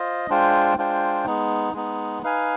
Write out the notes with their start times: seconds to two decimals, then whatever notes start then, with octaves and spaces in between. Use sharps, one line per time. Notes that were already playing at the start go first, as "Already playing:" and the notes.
Already playing: F4 C5 D#5
0.29 G#3 D4 F4 C5 G5
0.78 G#3 D4 F4 C5 G5
1.26 G#3 B3 D#4
1.74 G#3 B3 D#4
2.23 D#4 B4 F5 G#5